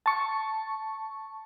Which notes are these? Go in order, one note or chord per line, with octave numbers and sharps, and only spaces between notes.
A5 C#6